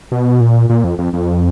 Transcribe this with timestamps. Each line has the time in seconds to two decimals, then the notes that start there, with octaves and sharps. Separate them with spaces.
0.12 B2
0.40 A#2
0.70 A#2
0.84 F2
0.99 F2
1.13 F2